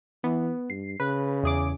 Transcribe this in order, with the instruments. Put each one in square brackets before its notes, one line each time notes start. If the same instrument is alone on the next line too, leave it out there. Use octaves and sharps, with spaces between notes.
[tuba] E3 [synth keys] B3
[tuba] G2 [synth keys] C7
[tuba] C#3 [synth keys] B4
[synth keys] E2 G#4 D6